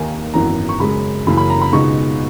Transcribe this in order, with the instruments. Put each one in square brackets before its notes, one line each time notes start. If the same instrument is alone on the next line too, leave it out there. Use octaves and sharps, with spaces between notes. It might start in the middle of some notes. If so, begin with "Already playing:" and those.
Already playing: [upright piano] D#2 D#3 A#3 D#4 G#5
G#1 F#2 E3 B3 A#5
C#6
F#2 C#3 G#3 B5
F#2 C#3 E3 A#3 B5
B5
A#5
B5
C#2 B2 G#3 B3 D#4 C#6